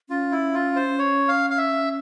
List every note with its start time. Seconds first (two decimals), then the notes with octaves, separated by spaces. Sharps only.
0.09 C#4 F4
0.32 E4
0.54 F4
0.76 C5
0.99 C#5
1.28 F5
1.50 F5
1.58 E5